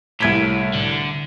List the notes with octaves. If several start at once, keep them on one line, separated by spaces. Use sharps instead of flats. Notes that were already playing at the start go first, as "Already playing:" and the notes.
C2 A2 G#6 B6
D3